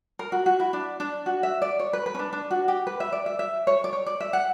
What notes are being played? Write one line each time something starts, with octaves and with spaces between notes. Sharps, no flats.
A#4
F#4
F#4
E4
D4
D4
F#4
E5
D5
C#5
B4
B4
C#4
D4
D4
F#4
G4
B4
E5
D5
E5
E5
C#5
D5
C#5
D5
E5
F#5